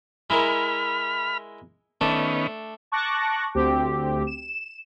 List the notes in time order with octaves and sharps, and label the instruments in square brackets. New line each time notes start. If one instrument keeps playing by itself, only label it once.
[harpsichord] G#3 E4 A#4 [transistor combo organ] B5 F6
[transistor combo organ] D#3 B3 C#4 [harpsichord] A3 D4
[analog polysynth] A5 C#6 D6 F#6 A#6
D2 C4 G4
E7